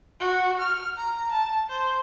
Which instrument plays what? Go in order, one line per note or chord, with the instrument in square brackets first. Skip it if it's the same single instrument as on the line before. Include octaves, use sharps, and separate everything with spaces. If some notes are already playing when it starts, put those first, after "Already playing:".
[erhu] F#4
F6
A#5
A5
C5